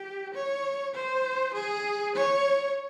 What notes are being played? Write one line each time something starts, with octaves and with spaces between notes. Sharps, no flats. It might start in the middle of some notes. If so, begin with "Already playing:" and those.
Already playing: G4
C#5
C5
G#4
C#5